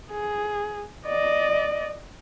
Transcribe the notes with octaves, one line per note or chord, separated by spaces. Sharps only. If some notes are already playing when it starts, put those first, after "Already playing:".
G#4
D5 D#5